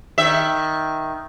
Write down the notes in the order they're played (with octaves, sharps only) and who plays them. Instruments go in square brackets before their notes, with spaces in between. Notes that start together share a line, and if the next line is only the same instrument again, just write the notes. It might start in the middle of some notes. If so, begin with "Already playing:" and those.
[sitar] D#3 E5